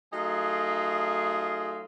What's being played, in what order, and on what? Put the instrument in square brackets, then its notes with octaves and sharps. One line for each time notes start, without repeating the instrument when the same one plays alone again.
[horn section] F#3 A3 D#4 F4 G#4